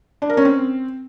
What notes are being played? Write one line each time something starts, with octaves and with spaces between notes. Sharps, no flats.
D4
A#4
C#4
C4